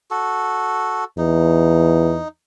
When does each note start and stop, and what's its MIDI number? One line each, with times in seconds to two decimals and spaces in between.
0.11 1.04 66
0.11 1.04 69
1.18 2.19 40
1.18 2.28 63